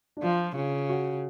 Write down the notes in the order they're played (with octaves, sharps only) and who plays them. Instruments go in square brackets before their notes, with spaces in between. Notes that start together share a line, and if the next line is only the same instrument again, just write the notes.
[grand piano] D4
[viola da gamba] F3 [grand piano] F4
[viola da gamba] C#3
[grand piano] F#4